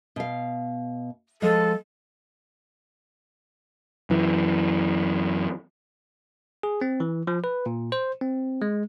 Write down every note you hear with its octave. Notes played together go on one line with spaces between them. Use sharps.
B2 F5
F3 G#3 A4
F#2 E3
G#4
C4
E3
F3
B4
A#2
C5
C4
G#3